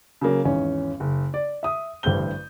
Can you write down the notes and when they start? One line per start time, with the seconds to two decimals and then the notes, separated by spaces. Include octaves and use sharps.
0.21 C#3 F#3 A#3 C#4
0.45 G#1 E2 C#4
1.00 F#1
1.34 D5
1.63 E5 D#6
2.03 A1 G2 D3 C5 G6 G7